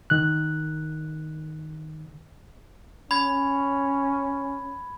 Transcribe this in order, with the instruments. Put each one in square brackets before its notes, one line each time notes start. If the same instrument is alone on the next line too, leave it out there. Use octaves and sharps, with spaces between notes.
[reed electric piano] D#3 F#6
[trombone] C#4 [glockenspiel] B5 G#6